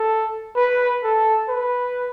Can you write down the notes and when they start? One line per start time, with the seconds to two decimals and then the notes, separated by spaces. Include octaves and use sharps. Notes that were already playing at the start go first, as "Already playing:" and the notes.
Already playing: A4
0.56 B4
1.03 A4
1.49 B4